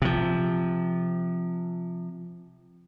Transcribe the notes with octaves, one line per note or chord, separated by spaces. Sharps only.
C3 F3